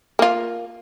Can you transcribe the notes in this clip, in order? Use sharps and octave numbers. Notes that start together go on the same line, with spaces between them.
A#3 F4